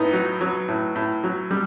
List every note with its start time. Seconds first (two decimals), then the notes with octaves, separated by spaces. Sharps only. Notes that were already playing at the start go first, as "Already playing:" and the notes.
Already playing: A2 B3 D#4
0.13 F#3
0.41 F#3
0.68 A2
0.95 A2
1.24 F#3
1.51 G3